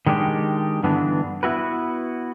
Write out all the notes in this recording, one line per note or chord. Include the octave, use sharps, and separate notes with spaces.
D#3 G#3 D4 G4
G2 D3 E3 B3 D4
B3 E4 F#4 B4